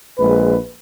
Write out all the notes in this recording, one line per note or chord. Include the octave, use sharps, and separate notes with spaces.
A#1 G#3 B4